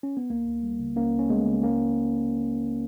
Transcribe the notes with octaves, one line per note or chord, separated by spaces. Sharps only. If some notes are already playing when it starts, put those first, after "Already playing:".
C#4
B3
C#2 A#3
C#2
G3
C#3
C#2 A#3 C#4
C#2
C#4
G3 G#3 B3
C#3
C#2 A#3 C#4